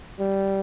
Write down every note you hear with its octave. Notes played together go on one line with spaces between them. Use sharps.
G3